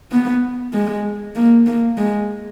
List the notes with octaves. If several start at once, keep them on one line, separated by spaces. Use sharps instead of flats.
B3
G#3
A#3
A#3
G#3